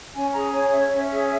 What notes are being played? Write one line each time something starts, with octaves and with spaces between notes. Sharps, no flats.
C#4 G#5
G#4 A#5
C#5 G#5
C#4 E5
C#4
G#4